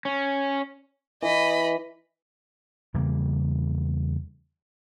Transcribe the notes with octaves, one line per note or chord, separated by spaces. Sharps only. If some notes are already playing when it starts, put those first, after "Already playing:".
C#4
E3 D#5 B5
E2 C#3 G3 A#3